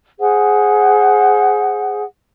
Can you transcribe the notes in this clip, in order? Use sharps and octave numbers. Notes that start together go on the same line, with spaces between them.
G#4 C5 F#5